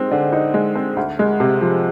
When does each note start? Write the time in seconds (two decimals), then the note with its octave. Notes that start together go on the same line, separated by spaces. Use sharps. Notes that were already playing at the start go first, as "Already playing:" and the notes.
Already playing: G#3 C4 D#4
0.11 D3
0.32 D#4
0.54 G#3
0.75 C4
0.97 D2
1.19 G#3
1.40 C3
1.61 F3